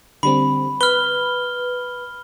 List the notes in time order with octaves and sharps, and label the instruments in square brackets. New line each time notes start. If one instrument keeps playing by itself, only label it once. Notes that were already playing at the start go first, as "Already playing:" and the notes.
[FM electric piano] D3 G3 C4 [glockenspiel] B5
[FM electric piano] B4 [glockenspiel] F6 G7